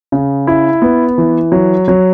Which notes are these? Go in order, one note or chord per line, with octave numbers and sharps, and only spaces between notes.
C#3
E4
B3
E3
F#3
F#3